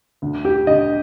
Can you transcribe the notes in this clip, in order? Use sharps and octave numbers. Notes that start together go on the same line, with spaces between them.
D2
G4
D3 D#5